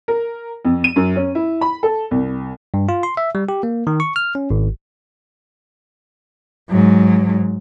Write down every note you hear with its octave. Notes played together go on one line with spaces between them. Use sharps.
A#4
F2
D#7
F#2
C#4
E4
B5
A4
C2
G2
F4
C6
E5
G3
G4
A#3
D#3
C#6
F6
C#4
G#1
G#2 F#3